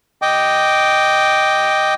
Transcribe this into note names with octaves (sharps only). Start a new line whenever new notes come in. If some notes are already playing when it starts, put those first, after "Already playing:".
D#5 G5 D6